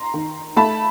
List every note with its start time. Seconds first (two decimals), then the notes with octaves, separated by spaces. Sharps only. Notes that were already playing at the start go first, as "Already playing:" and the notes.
Already playing: A#5 C6
0.14 D#3
0.56 A3 A5 B5